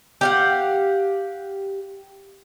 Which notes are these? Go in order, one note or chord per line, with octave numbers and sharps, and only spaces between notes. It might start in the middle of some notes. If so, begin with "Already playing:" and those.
G4 F5 F#5